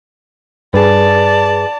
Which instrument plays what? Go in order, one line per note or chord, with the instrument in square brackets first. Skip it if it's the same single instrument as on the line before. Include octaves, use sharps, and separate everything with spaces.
[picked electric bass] G2 [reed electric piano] G#4 B4 [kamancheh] D5 A5